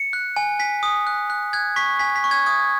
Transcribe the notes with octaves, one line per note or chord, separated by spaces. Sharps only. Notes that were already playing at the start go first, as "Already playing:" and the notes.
Already playing: C#7
F#6
G#5
G#5 B6
D#6
F#6
F#6
F#6 G#6
C#6 B6
G#5 B6
B6
C#6
G#6
D#6 G#6